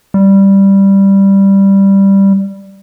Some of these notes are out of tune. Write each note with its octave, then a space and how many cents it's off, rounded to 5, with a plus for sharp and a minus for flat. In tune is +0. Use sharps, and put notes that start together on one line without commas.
G3 +0